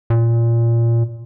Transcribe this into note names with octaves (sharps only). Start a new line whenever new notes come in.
A#2